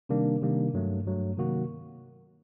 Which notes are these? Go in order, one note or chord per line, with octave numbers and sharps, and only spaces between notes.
C3 D#3 G3 A#3 D4
C3 D#3 G3 A#3 D4
G2 F#3 A3
G2 F#3 A3
C3 D#3 F#3 A#3 F#4